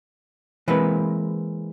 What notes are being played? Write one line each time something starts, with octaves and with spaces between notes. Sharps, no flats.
E3 G#3 A#3 C4 B4